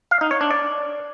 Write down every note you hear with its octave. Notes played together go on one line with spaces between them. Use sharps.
F5
D#4
C#5
D4
D5